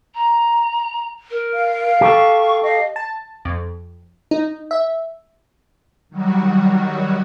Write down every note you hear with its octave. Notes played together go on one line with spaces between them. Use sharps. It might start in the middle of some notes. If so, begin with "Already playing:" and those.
A#5
A#4
F5
G4 A4 C#6
D#5 F5
A5
F2
D#4
E5
D#3 F#3 G3 F#4